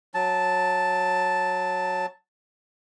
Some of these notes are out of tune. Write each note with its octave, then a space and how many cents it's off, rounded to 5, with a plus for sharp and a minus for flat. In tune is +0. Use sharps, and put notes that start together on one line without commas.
F#3 -10 A5 +0